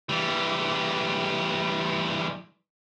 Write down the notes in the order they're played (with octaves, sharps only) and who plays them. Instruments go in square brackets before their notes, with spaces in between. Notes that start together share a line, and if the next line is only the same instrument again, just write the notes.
[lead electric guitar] E3 G3